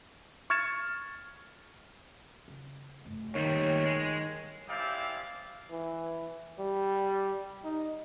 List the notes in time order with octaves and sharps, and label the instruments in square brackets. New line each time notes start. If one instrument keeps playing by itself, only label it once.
[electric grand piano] C#6 F6 G#6 A6 C#7 E7
[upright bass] C#3
F1 G2
[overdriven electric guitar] D#2 G3 [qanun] D#3 [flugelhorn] C#5
[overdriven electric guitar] G#3
[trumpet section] G#3 C4 E4 G4 D5 F5
[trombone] E3
G3
D#4